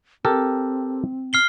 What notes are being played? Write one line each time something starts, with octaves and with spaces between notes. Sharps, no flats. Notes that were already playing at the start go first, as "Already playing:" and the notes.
C4 G4 A4 A#4
F6 C7 G7